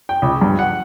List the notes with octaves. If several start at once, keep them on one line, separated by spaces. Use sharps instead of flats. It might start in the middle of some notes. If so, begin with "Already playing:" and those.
G5
C#2
G2
F#5